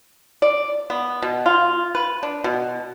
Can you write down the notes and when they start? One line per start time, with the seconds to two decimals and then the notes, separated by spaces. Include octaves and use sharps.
0.42 D5
0.90 B3
1.22 B2
1.46 F4
1.95 B4
2.23 D4
2.44 B2